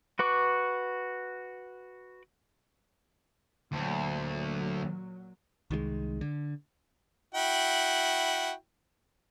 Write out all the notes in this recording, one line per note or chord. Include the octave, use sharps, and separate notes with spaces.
F#4 B4 C#6 D6
D2 A#2 F#3
C2 D#3 F#3 G#3
D3
E4 F#4 G5